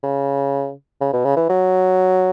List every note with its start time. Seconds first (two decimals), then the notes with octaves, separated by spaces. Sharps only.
0.03 C#3
1.01 C#3
1.13 B2
1.25 C#3
1.36 E3
1.49 F#3